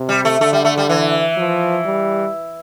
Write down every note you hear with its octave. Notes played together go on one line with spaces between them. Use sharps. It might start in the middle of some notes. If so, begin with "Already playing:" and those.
Already playing: C3
G3
A3
D3 A3
G3
A3
G3
E3
F3
G3